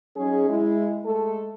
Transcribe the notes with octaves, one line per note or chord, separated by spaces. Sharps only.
F#3 C#4 D#4 G#4
G#3 E4
G#3 A3 A4